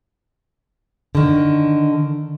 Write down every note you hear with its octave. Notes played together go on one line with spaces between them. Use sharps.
D3 D#3